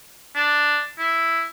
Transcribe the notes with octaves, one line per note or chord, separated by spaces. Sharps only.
D4
E4